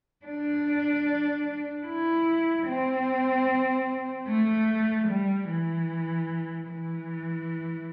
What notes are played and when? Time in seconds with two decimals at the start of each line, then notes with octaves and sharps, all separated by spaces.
0.26 D4
1.87 E4
2.66 C4
4.28 A3
5.08 G3
5.48 E3
6.68 E3